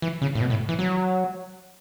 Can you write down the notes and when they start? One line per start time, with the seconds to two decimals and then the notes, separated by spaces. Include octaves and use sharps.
0.02 E3
0.22 C#3
0.35 A2
0.40 B2
0.50 A2
0.69 E3
0.79 F#3